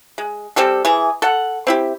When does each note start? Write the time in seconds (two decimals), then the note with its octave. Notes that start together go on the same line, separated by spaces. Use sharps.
0.18 G#3
0.56 G3 C4 G4 A4
0.85 E3 G#4
1.22 A4 F#5
1.67 C4 E4 G4